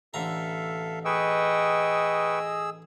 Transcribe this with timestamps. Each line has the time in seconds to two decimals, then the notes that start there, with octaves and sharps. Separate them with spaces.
0.14 A1 D3 A4 E5 F5 A#5
1.05 G#4 B4 D#5 G5 C#6 E6